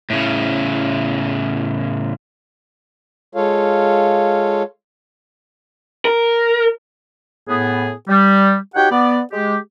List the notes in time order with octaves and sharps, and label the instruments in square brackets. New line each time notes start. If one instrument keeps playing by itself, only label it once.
[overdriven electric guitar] A2 C#3
[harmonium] G#3 F4 A4 C#5 F5
[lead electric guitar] A#4
[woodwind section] A2 B3 G#4
G3
D#4 F#4 G4 C#5 F#5 G5
B3 D5
G#3 G4